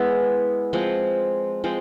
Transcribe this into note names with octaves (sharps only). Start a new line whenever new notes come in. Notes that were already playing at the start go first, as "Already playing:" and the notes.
Already playing: G#3 B3 E4
F3 G#3 C4
F3 G#3 C4